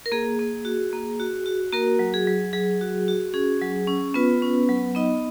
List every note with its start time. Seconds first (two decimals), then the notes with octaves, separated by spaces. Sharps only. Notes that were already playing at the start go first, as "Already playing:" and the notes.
0.06 A#4
0.12 A#3 G#4
0.39 A#3
0.65 F#4
0.93 A#3
1.20 F#4
1.46 F#4
1.72 A#3 F#4 A#4
1.99 F#3
2.14 G#4
2.27 F#3
2.53 F#3 G#4
2.81 F#4
3.08 F#4
3.34 C#4 G#4
3.62 F#3
3.87 C#4
4.14 B3 F4 B4
4.42 C#4
4.69 F#3
4.95 B3 D#4 D#5